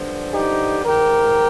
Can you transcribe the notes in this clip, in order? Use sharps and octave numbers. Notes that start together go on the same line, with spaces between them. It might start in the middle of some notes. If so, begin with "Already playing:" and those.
Already playing: G2 D3 F3
D#4 G4
G#2 D#3 G4 A#4